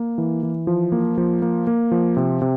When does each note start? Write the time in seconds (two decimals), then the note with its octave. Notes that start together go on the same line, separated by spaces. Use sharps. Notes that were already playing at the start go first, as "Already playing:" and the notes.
Already playing: A#3
0.18 E3
0.43 E3
0.67 F3
0.92 A#3
1.18 F3
1.42 A#3
1.67 A#3
1.92 F3
2.17 C3
2.42 C3